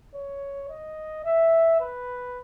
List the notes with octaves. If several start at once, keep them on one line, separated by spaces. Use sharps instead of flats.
C#5
D#5
E5
B4